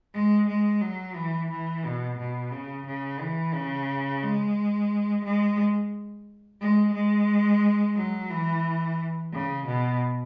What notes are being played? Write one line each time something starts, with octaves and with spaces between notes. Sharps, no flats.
G#3
G#3
F#3
E3
E3
B2
B2
C#3
C#3
E3
C#3
G#3
G#3
G#3
G#3
F#3
E3
C#3
B2